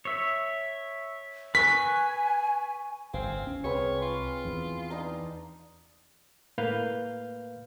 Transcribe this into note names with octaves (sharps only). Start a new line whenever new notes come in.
C#5 E5
B4 G#5 C#6 F#6 B6
G1 A2 C4 F5 G#5
D2 C#4
C2 G#3 C4 B4 C#5
F4
E2 E3
D4 D#4 A#5
A2 A#3 B4 F5 F6 G6